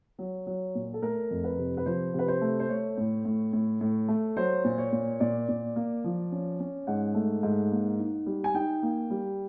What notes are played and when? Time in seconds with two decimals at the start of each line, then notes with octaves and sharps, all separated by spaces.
0.19 F#3
0.47 F#3
0.75 A#2
0.94 A4
1.02 A3 A#4
1.30 F2
1.44 B4
1.58 C3
1.77 B4
1.86 F3 C5
2.14 C3 B4
2.28 C5
2.41 A3
2.60 C5
2.69 A3 C#5
2.98 A2
3.25 A2
3.53 A2
3.81 A2
4.08 A3
4.37 F#3 C5
4.64 A#2
4.78 C#5
4.92 A#2
5.20 A#2 D5
5.49 A#2
5.76 A#3
6.04 F3
6.32 C#4
6.60 C#4
6.87 G#2 F#5
7.15 A3
7.43 G#2
7.71 A#3
7.99 D#4
8.26 G3
8.44 G#5
8.54 D#4 G5
8.83 A#3
9.10 G3